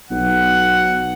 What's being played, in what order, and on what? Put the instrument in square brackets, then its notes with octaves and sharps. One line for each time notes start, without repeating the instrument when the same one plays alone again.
[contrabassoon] B1 [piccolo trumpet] F#5